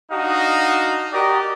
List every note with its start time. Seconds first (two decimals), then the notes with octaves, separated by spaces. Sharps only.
0.10 D4 D#4 F#4 D#5 F5
1.12 F#4 G4 A#4 D5 D#5